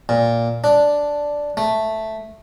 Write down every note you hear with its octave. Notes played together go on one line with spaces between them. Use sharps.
A#2
D4
A3